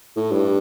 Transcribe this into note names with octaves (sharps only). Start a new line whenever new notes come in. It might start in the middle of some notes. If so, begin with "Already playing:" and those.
A2
G2